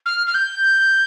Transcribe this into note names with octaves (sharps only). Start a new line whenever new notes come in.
F6
F6
G6